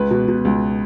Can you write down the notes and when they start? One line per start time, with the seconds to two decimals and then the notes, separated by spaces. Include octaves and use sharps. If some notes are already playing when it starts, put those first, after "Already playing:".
Already playing: C#2 B4
0.11 B2
0.28 B2
0.45 C#2